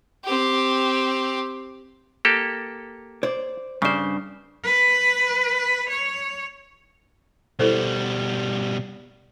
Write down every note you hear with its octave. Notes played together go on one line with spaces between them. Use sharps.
C4 G4
A#3 G4 A4
C5 D5
G2 C#3 C5 D5
B4
C#5
B2 G3 E4 A4 C5